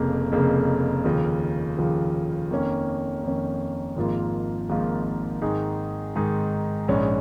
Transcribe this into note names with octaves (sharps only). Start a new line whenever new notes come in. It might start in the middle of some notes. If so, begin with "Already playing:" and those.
Already playing: F1 F2 C#3 A#3
F1 F2 C#3 A#3
D#2 C#3 F3
D#2 C#3 F3
F2 D#3 A#3 C#4
F2 D#3 A#3 C#4
G#1 G#2 F3 A#3 F4
G#1 G#2 F3 A#3 F4
G#2 D#3 G#3 D#4 G#4
G#2 D#3 G#3 D#4 G#4
A#1 G#2 G#3 C#4